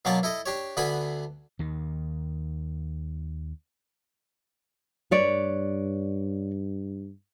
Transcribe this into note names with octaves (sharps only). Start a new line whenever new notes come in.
B2 F#3 A#3 B3 D5 A5
E4 A4 D#5
D4 G4 C#5
D2 D3 B3 B4 G#5 B5
D#2 D#3
G2 B4 C#5 D5